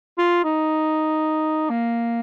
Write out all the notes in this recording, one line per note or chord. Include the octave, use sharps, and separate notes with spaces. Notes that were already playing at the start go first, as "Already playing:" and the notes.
F4
D#4
A#3